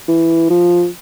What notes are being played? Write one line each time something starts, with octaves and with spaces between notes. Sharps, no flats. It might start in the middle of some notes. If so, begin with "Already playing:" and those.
E3
F3